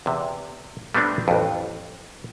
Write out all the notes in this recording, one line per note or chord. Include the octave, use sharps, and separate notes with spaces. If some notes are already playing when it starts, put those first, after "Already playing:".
E2 C3
G3 A3 B3 C4 D4
A1 F2